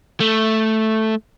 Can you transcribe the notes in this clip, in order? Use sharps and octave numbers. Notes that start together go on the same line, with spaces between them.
A3